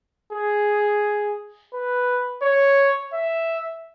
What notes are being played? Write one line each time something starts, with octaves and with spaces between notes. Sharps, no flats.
G#4
B4
C#5
E5